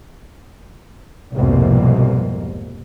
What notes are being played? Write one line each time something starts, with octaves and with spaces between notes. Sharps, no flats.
C2 F2 G#2 B2 A#3